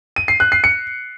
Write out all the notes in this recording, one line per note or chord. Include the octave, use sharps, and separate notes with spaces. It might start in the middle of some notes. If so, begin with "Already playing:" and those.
D#7
C7
F#6
C7
C#7